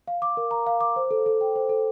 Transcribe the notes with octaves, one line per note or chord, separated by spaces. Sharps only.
F5
D6
A#4
A#5
F5
D6
C5
A4
A4
G5
C5
A4